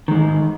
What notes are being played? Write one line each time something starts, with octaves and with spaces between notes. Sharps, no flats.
G#2 D#3 G#3